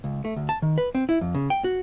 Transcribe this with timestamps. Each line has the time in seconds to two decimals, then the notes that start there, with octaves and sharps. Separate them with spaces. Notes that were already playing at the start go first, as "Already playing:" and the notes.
0.04 C#2
0.25 A3
0.36 D2
0.49 A5
0.62 D#3
0.78 B4
0.95 C4
1.09 E4
1.21 F2
1.35 C#3
1.50 G5
1.64 F#4